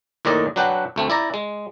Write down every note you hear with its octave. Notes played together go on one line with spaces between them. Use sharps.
D#2 A2 D#3 D5 D#5
F#3 D4 B4 F#5 G5
D2 A3 C4
E4 D5 A#5
G#3